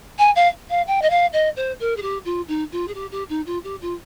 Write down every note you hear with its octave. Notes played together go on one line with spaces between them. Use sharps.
G#5
F5
F5
G5
D#5
F5
D#5
C5
A#4
G#4
G4
F4
D#4
F4
G#4
G4
G4
D#4
F4
G4
F4